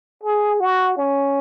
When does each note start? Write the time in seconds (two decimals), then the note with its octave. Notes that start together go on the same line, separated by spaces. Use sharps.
0.24 G#4
0.60 F#4
0.97 C#4